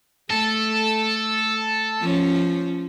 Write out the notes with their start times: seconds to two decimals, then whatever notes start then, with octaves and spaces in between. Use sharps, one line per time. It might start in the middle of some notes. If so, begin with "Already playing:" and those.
0.30 A3 A4
2.01 F3 C#4